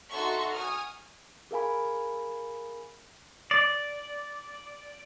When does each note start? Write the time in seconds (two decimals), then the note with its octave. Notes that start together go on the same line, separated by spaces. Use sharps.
0.10 D#4 F#4 A4 E5 C6 C#6
0.53 G#5 C#6 D#6 F6
1.51 G#4 A#4 F5 G#5 B5
3.51 D5